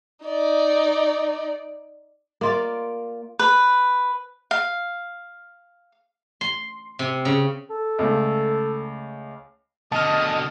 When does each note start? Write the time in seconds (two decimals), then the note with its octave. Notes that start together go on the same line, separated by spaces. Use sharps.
0.25 D#4 D5
2.41 A#3 F4 D5
3.39 B4
4.51 F5
6.41 C6
6.99 C3
7.25 C#3
7.70 A4
7.99 C#2 A3
9.92 B2 D3 D#5 A5 F6